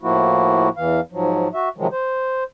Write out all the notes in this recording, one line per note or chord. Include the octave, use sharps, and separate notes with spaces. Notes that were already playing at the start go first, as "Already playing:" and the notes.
A2 F3 A#3 E4 F#4
E2 E3 F5
G#2 F3 F#3
F#4 E5
C3 D#3 F3 F#3 G#3
C5